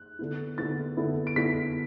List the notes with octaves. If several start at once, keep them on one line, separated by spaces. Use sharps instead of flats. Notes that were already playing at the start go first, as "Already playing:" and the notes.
Already playing: F#6
D3 B3 E4
D3 B3 E4 A6
D3 B3 E4
D7
D3 B3 E4 B6